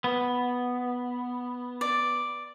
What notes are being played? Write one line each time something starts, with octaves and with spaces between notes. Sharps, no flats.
B3
D5